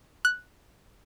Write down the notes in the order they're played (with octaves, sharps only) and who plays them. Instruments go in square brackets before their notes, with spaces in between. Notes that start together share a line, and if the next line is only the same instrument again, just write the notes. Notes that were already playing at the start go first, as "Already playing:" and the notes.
[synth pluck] F#6